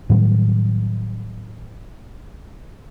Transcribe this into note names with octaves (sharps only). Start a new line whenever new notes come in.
A2 D#3 F#3 G3